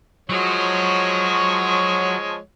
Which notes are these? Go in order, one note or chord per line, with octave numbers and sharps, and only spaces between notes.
F3 F#3 G#3 F#4 C#5